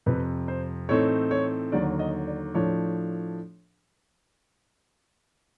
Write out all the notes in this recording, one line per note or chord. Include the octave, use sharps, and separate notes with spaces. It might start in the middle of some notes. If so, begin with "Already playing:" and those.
F2 C3 F3 B4
C5
A2 E3 A3 C4 D#4 C#5
C#5
D#2 D3 F#3 D5
D#5
D5
A2 F3 A3 D4 C#5